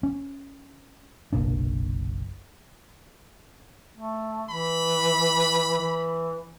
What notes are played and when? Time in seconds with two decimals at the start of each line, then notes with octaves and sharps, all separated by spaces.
0.03 C#4
1.33 F#1 B1 A#2 D4
3.97 A3
4.50 E3 B5
5.81 E3